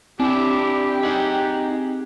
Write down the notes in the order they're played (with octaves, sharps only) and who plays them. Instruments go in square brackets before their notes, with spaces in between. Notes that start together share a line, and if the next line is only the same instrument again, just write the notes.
[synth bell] C4 [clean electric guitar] D4 E4 [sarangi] G4
[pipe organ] D#4 [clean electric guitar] G#4 F#5